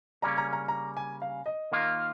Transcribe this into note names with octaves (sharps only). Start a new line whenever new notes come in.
C#3 G3 A#3 C#4 A#5
A#5
A#5
A#5
G#5
F5
D#5
D#3 A#3 F4